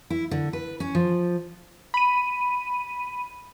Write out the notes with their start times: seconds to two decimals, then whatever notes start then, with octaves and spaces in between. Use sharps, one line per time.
0.10 E4
0.31 D3
0.53 B4
0.80 C#4
0.95 F3
1.94 B5 D#7